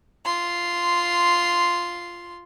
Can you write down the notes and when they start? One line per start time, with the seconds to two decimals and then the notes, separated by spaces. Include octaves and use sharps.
0.25 F4 C6